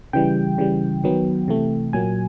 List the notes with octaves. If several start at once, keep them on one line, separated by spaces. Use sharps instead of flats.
C#3 E3 G3 G5
C#3 E3 G3
D#3 F#3 B3
C3 E3 A3
A#2 F#3 A#3 G#5